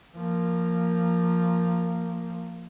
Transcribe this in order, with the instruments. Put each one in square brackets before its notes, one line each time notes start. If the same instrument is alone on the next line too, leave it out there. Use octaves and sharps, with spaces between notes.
[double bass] F3 A#3